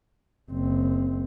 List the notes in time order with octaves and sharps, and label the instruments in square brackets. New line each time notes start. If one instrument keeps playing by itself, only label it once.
[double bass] F#1 C4